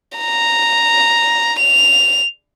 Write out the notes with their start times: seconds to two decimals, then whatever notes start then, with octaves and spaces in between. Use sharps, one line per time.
0.18 A#5
1.59 F7